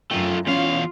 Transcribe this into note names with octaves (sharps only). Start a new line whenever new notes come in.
F#2 A3 F4 G5
E2 C#4 F4 F5